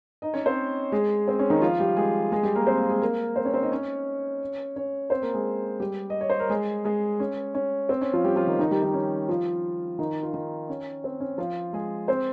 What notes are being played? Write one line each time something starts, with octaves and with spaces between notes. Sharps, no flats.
D#4 D#5
C#4 C#5
C4 C5
G#3 G#4
C4
C#4
D#3 D#4
F3 F4
G3 G4
G#3 G#4
G#3 G#4
G3 G4
A#3 A#4
C4 C5
A#3 A#4
G#3 G#4
A#3 A#4
C4 C5
C#4 C#5
C4 C5
D#4 D#5
C#4 C#5
C#4 C#5
C4 C5
A#3 A#4
G#3 G#4
G3 G4
D#5
C#5
C5
A#4
G#3 G#4
G#3 G#4
C#4
C#4
C4
C#4
F3 F4
G3 G4
F3 F4
D#3 D#4
D#3 D#4
G3 G4
D#3 D#4
C#4
F3 F4
D#3 D#4
F4
D#3 D#4
C#4
C4
C#4
F3 F4
G#3 G#4
C4 C5